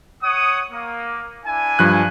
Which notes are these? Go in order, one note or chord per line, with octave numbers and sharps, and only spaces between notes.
C#5 F#5 D#6
A#3
D4 E4 G#5
G2 F3 F#6